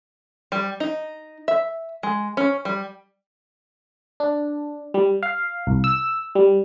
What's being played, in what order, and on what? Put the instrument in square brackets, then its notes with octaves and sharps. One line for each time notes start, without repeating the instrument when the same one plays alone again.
[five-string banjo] G3
D#4
E5
G#3
C#4
G3
[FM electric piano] D4
G3
F5
C2
E6
G3